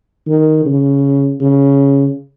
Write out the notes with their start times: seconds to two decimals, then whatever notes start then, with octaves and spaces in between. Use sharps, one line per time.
0.27 D#3
0.65 C#3
1.40 C#3